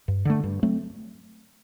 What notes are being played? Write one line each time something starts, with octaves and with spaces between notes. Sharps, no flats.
G2
D3 A3
G2
F#3 A3 C4